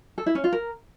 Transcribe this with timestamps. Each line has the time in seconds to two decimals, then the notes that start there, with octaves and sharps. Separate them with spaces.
0.18 A4
0.26 E4
0.35 C#4
0.44 F4
0.53 A#4